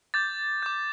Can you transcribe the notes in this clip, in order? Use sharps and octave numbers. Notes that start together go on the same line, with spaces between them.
D6 G6 A6
D6 G6